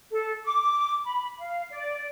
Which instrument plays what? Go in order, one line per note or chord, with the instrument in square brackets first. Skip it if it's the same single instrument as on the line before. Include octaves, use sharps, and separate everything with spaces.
[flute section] A4
D6
B5
F5
D5